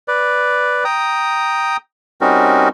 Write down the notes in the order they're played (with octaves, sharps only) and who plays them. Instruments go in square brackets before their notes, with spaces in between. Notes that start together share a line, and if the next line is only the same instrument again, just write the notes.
[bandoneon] B4 D5
G5 A#5 D#6
G3 C4 C#4 D#4 F#4 A#4